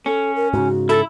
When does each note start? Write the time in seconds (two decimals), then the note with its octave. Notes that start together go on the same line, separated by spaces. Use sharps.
0.06 C#4 A4
0.36 A#4
0.54 G#2 C#3 F#4
0.89 E4 A4